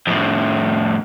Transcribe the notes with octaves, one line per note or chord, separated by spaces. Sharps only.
F2 A2